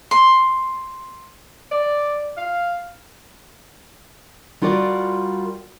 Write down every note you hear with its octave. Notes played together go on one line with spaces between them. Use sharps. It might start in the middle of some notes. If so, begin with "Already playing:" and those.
C6
D5
F5
G3 F4 F#4 A#4 D5